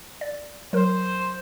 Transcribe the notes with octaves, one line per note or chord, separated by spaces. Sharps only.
D5
F#3 A#4 C5